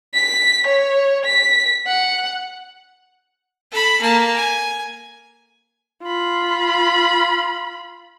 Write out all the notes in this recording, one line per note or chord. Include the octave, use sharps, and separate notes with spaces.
B6
C#5
B6
F#5
A4 B5
A#3 A5
G#5
F4 B5